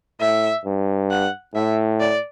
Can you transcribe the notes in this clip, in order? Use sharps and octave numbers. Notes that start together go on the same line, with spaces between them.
A2 E5
G2
F#5
A2 E5
D5